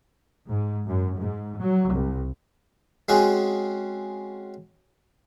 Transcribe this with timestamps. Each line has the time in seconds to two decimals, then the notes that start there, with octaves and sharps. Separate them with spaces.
0.47 G#2
0.86 F#2
1.17 G#2
1.58 F#3
1.90 C2
3.09 G#3 C4 C#4 F#4 G#4